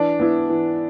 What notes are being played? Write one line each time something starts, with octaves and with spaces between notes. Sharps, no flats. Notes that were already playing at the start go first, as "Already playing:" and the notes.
Already playing: E3 D4
B3 E4
E3